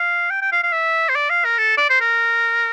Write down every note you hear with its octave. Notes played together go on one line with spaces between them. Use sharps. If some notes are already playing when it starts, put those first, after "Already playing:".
Already playing: F5
G5
G5
F5
F5
E5
C5
D5
F5
A#4
A4
D5
C5
A#4